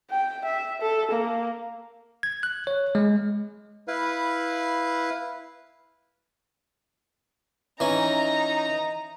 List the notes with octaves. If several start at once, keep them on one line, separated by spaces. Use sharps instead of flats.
G5
E5
A4
A#3
G#6
F#6
C#5
G#3
E4 B4 F5
E3 C#4 D#4 A#5